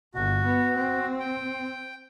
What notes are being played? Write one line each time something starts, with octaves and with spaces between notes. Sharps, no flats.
G1 F#4
B3
C4
G5